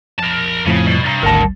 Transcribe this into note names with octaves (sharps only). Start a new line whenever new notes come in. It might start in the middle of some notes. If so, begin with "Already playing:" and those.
F2 A#4 A5
F2 A2 C#3 F3
C2 B2
G2 A#5
G#1 D2 A#4 F#5 A5